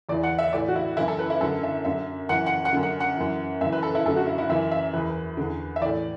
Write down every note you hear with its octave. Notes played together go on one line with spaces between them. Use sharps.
E2 E3 D5
F#5
E5
A2 E3 D5
F#4
E4
F#2 E3 E4
A4
B4
E4
F#2 D3 A4
E5
F#2 D3 E5
F#2 E3 F#5
F#5
F#5
F#2 D3
F#5
F#5
F#2 E3
F#2 E3 E5
B4
A4
E4
F#2 D3 A4
F#4
E4
E4
F#2 E3 E5
E5
E2 E3 B4
E2 D3
E5
A2 E3 D5